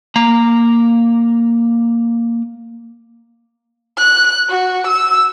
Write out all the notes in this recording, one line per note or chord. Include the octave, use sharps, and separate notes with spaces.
A#3 A#5
F#6
F#4
E6